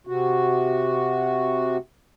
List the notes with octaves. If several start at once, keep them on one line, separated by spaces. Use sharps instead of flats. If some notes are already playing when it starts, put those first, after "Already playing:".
C3 F#4